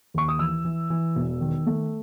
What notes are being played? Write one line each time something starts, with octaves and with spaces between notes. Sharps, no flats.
D#2 C#6
D#6
E3 E6
E3
E3
E1
D#3
A3